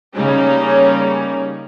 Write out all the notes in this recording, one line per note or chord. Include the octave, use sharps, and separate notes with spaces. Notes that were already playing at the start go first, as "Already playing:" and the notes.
C#3 G3 A#3 C#4 D#4